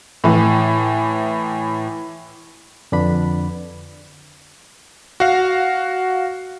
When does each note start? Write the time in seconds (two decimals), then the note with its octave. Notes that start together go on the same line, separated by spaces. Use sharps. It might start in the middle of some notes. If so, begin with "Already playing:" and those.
0.24 A2 E3
2.92 F2 D3 D4 B4 B5
5.20 F#4 F5